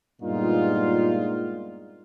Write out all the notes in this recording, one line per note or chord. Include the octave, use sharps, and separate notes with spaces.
G2 A#2 G#3 B3 D#4 F4